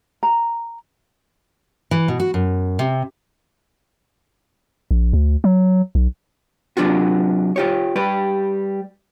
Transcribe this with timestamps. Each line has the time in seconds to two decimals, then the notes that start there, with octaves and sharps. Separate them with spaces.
0.23 A#5
1.91 E3
2.08 B2
2.20 F#4
2.34 F#2
2.79 C3
4.91 A#1
5.13 D2
5.44 F#3
5.95 B1
6.77 C3 F#3 D4 F4 F#4
7.56 F4 G4 C#5
7.96 G3 G4 B4